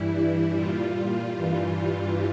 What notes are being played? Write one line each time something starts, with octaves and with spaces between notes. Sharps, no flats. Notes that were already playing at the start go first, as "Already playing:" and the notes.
Already playing: G2 E3 G3 E4
A#2 G3 F4
G2 E3 G3